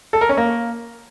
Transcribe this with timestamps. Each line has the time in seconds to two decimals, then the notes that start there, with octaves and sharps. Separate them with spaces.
0.13 A4
0.21 A#4
0.29 C#4
0.37 A#3